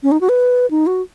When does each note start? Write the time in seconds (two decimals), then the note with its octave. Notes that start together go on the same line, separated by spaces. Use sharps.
0.03 C#4
0.12 D#4
0.21 F#4
0.29 B4
0.71 D#4
0.87 F#4